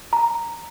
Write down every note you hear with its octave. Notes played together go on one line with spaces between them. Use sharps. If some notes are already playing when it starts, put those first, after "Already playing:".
A#5